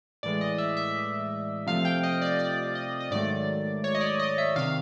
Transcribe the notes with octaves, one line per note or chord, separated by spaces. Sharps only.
A2 E3 G#3 D5
D#5
E5
E5
C3 F3 A3 F5
G5
D#5
D5
D5
D#5
D#5
G#2 D#3 F#3 A3 D5
C#5
D#5
D5
D#5
E5
C3 D#3 F5